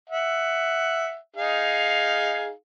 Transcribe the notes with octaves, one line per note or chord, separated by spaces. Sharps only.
E5 F#5
D#4 G#4 F5